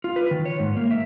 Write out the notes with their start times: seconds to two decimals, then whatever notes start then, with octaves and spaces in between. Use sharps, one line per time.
0.04 F4
0.16 B4
0.31 D#3
0.45 C#5
0.60 G#2
0.76 A#3
0.91 E5